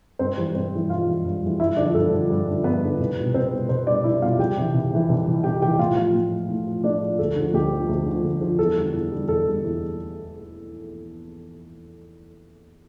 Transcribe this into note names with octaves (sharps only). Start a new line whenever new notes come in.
G2 C4 C5
E3 G3
G2 C4 C5
E3 G3
G2 F4 F5
E3 G3
G2
E3 G3
G2 E4 E5
D3 F3 D4 D5
G2 A4
D3 F3
G2
D3 F3
G2 B3 B4
D3 F3
C2
B2 G3
C2 C4 C5
B2 G3
C2 C4 C5
B2 G3 D4 D5
C2 E4 E5
B2 G3 F4 F5
C2 G4 G5
C3 E3
C2
C3 E3
C2
C3 E3
C2 G4 G5
C3 E3 G4 G5
A2 F4 F5
F3 F4 F5
A2
F3
A2
F3
A2 D4 D5
F3
D2 A4
D3 F3
D2 G4
D3 F3
D2
D3 F3
D2
D3 F3
E2 A4
D3 G3
E2
D3 G3
E2 A4
D3 G3
E2